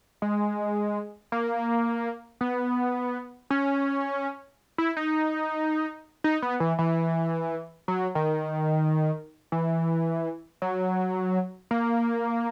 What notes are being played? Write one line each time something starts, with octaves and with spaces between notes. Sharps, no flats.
G#3
A#3
B3
C#4
E4
D#4
D#4
B3
E3
E3
F#3
D#3
E3
F#3
A#3